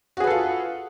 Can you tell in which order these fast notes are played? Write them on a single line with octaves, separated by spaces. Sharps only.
F#4 G#4 B4 A4 F4